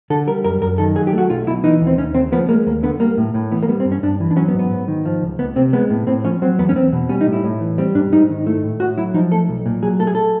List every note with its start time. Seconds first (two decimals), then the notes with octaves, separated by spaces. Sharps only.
0.10 D3 A4
0.27 G3 A#4
0.44 F#2 A#4
0.61 F#2 A#4
0.78 D#3 A4
0.96 F#3 G#4
1.07 G4
1.13 A3 F#4
1.29 B1 F4
1.47 B2 E4
1.64 E3 D#4
1.81 D#2
1.87 C4
1.98 D#2 C#4
2.15 C#3 C4
2.32 F3 B3
2.49 G#3 A#3
2.66 D#2 A#3
2.83 D3 B3
3.00 G3 A#3
3.17 A2
3.34 A2
3.51 E3 B3
3.63 A#3
3.68 G3 B3
3.80 C4
3.85 G2
3.92 C#4
4.03 G2 D4
4.20 E3
4.31 D4
4.36 F#3 C#4
4.48 B3
4.54 G#2
4.59 B3
4.71 G#2
4.88 D#3
5.05 F3
5.22 C#2
5.39 C#2 B3
5.56 C3 C4
5.73 G#3 B3
5.90 A2
6.07 A2 C4
6.24 F3 C#4
6.42 F#3 C4
6.59 E2 B3
6.69 C#4
6.75 E2 C4
6.92 B2
7.09 G3 C#4
7.21 D#4
7.27 A2
7.33 E4
7.44 A2
7.61 E3
7.78 G3 C4
7.95 G#2 D4
8.12 G#2 D#4
8.30 D#3
8.47 A3 E4
8.63 A2
8.80 A2 F#4
8.98 F#3 E4
9.14 F3 D#4
9.31 A3 A4
9.49 B1
9.66 A#2
9.82 F#3 G#4
9.99 A3 A4
10.07 G#4
10.15 A4